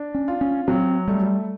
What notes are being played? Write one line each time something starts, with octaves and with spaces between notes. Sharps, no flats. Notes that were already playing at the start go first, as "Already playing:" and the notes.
Already playing: D4
C#4
F4
C#4
F#3 C4
G3 A3